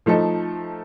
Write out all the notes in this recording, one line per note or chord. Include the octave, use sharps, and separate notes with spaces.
F3 A3 D#4 A4